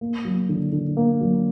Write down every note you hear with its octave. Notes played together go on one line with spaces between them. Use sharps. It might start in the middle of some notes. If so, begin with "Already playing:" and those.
A#3
F#3
D3
D3
A#3
F#3